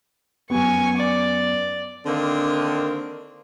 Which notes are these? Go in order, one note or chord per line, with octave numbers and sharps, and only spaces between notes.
F#2 B3 G#5 C#6
D5
D3 D#3 A#3 C4